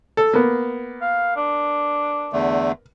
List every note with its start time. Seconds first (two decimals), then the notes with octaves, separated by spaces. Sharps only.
0.17 A4
0.33 A#3 B3
1.01 F5
1.36 D4
2.33 E2 D3 A3